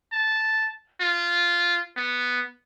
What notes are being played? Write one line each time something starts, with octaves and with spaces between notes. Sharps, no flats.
A5
F4
B3